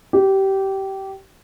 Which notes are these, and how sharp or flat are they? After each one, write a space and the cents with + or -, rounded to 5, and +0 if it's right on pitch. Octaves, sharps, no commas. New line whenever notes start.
G4 -20